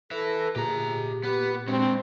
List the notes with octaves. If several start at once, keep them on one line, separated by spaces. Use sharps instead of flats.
A4 B4 E5 A#6
A#2 G4 G#4 A#5
B3 G4 B4
G#3 C4 D4 F#4